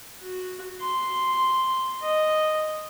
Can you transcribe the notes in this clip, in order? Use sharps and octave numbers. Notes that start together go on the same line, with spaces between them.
F#4
C6
D#5